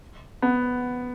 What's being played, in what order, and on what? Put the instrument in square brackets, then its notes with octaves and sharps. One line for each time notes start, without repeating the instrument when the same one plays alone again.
[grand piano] B3